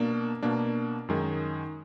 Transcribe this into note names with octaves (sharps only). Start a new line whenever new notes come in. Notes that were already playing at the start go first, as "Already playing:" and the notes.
Already playing: B2 A#3 D4
B2 A#3 D4
F#2 D#3 G#3